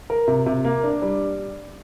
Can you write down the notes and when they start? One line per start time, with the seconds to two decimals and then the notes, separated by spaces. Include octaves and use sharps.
0.10 A#4
0.28 C3
0.46 C3
0.65 A#3
0.84 D4
1.02 G3